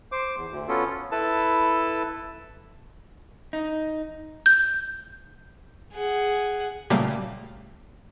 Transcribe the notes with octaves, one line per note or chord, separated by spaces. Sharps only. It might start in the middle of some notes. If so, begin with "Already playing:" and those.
C5 D6
E2
D2
B3 C#4 F4 A4
E4 A4 B4 A5
D#4
G6
G#4 F#5
A#2 C#3 F#3 G3 A3 A#3